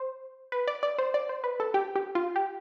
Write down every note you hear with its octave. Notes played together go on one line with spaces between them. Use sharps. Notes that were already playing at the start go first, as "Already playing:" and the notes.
Already playing: C5
B4
D5
D5
C5
D5
C5
B4
A4
G4
G4
F4
G4